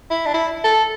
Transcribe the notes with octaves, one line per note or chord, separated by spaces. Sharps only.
E4
D4
E4
A4